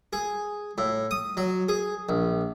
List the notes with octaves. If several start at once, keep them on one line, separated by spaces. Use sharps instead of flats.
G#4
A2
D#6
F#3
G#4
A#1